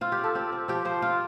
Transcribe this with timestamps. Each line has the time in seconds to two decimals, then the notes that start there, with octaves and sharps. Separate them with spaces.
0.01 C4 F4
0.12 G4
0.19 C4 A4
0.35 C4 G4
0.52 C4
0.68 F3 G4
0.85 F3 C5
1.02 C4 F4